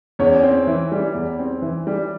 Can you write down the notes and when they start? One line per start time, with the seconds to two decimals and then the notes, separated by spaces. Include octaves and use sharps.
0.19 E2 C#4 C#5
0.43 C4
0.67 E3
0.92 G3
1.14 E2
1.39 C4
1.62 E3
1.87 G3